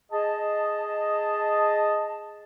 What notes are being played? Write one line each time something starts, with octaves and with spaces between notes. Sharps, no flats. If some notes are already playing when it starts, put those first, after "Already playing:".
G#4 D#5 A5